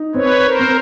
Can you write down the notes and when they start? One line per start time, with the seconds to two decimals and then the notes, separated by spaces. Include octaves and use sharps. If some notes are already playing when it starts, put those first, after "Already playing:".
Already playing: D#4
0.14 C4 B4 C#5
0.45 A#4 C5
0.59 C4